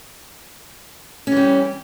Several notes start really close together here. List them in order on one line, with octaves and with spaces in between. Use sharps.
C#4 E3 G3